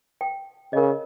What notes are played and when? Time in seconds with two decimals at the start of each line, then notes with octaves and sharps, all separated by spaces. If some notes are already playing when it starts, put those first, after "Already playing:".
0.21 G5
0.73 C#3 A#4 D#5